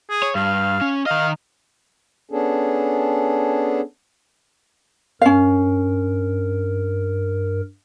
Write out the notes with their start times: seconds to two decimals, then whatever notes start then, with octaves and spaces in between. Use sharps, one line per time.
0.10 G#4
0.23 C#5
0.35 G2 F5
0.81 C#4
1.06 D#3 D#5 F5
2.31 B3 C#4 D4 G#4 A4
5.21 G2 C#4 A#4 F5